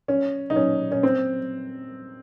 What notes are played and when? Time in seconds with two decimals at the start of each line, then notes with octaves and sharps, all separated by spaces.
0.08 C#4
0.50 D#4
0.56 C#4
0.92 C#4
1.03 C4